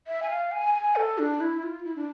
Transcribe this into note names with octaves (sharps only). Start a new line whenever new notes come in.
E5
G#5
F5
G#5
G#5
A4
D4
E4
F4
E4
D4